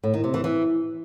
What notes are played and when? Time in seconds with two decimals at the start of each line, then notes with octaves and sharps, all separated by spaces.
0.03 A2
0.14 D#3
0.24 C3
0.34 E3
0.44 E3